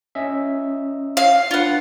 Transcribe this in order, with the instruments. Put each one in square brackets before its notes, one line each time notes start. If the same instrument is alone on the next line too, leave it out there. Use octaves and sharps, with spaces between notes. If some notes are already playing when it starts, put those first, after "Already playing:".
[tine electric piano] C#4 D#5 E5
[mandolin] F5
[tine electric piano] D4 B4 [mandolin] F4 F#5